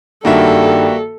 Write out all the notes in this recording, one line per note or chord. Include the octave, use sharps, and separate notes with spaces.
G2 D#3 G3 A#3 F#4 A4 E5